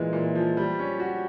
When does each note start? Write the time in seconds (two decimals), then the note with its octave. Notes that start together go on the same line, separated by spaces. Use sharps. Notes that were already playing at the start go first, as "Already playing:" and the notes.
Already playing: A#2 E3 G#3
0.13 A#2
0.35 F3
0.57 G3
0.79 C#4
1.00 F#4